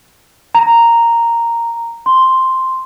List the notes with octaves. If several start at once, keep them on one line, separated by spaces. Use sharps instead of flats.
A#5
C6